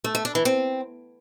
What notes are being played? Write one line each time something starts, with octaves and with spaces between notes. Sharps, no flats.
A3
A3
D4
E3
C4